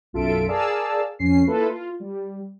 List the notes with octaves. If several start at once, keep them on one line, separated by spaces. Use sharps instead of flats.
B1 F#2 F4 A4 E5 D7
G#4 A#4 D5 F5 A5 E6
F2 C#4 C7
A#3 E4 F4 A4 B4
F4
G3